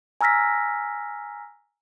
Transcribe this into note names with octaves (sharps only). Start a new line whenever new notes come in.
G#5 A#5 E6 F6 A#6 B6